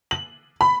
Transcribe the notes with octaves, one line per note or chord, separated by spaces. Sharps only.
F#7
B5